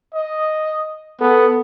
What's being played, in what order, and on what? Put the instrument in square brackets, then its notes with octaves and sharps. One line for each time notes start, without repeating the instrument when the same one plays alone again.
[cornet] D#5
[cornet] B3 [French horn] A4